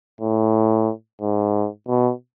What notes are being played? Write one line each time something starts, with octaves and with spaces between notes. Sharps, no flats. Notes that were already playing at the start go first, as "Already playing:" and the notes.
A2
G#2
B2